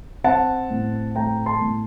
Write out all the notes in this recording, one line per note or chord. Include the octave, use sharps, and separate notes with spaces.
C4 F#5 A5
A2
A3 G5 A#5
A5 C6
A2